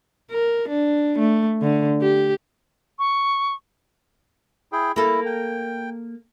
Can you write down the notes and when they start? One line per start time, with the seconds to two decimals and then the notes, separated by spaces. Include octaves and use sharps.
0.31 A#4
0.69 D4
1.19 A3
1.62 D3
2.02 G4
2.99 C#6
4.72 E4 G#4 G5
4.96 A#3 E4 A4
5.26 G5